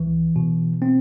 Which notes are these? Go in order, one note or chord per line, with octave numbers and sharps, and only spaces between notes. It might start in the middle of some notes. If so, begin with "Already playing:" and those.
Already playing: C#2 E3
B2
C4